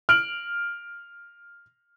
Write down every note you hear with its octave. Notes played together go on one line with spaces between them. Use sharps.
F6 D7 F#7